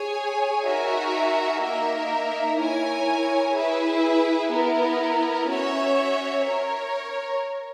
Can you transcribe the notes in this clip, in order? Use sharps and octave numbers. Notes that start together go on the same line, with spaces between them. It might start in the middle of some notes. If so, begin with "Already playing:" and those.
Already playing: G#4 C#5 G#5
D#4 F#4 A#4 E5 G#5
A#3 D#4 A#4 E5
E4 A#4 C#5 G#5
E4 G#4 B4 E5
B3 E4 A#4
C#4 F#4 C#5 E5
A#4 C#5